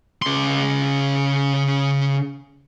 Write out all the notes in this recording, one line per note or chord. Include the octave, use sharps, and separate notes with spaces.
C#3 C6